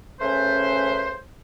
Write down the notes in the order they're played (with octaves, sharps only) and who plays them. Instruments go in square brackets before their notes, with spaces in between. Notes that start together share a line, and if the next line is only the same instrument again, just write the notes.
[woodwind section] C#3 A3 C#4 B4 C5